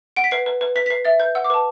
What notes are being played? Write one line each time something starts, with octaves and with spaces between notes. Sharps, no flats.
F#5 D7
B6
B4 C7
B4
B4
B4 B6
B6
B4 C7
E5 A6
B4 G6
F#5 E6
D6
B4 A5